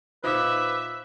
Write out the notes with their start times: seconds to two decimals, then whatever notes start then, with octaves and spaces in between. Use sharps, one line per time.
0.24 A#2 D#4 B4 C5 E5 F5 D6